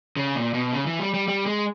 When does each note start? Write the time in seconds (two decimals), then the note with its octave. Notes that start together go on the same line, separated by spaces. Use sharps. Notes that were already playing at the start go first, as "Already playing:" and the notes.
0.16 C#3
0.35 A#2
0.54 B2
0.73 C#3
0.86 E3
0.99 G3
1.14 G3
1.28 G3
1.46 G#3